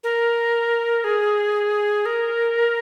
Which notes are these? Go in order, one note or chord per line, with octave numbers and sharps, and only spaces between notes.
A#4
G#4
A#4